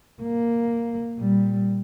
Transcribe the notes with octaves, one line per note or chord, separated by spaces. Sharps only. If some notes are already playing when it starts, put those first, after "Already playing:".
A#3
A#2 G3